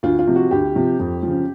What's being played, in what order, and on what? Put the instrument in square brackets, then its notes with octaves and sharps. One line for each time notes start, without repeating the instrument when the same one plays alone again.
[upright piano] D2 F4
F4
C3 F3
F#4
D2 G4
C3 F3
F2
F3
C#3